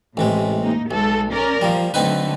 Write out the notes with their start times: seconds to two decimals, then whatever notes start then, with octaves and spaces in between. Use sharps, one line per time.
0.17 A1 A2 C3 G#3
0.61 A#3 D#4
0.91 B1 G#3 A4
1.30 C#4 A#4 D5
1.61 F3 G3 A#3
1.94 D3 F#3 A3 C4 D#4 B4